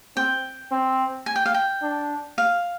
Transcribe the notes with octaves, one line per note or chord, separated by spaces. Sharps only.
C4 G5
C4
G#5
G5
F5
G5
D4
F5